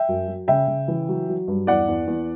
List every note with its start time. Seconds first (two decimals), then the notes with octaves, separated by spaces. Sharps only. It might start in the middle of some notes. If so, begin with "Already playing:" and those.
Already playing: E5 G5
0.09 F#2
0.28 F#3
0.48 C#3 E5 G5
0.68 C#3
0.88 E3
1.09 F#3
1.29 F#3
1.48 G2
1.67 E2 D5 F#5
1.88 E2
2.07 E2